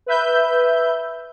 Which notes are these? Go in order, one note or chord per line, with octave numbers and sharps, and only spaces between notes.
B4 E5 G6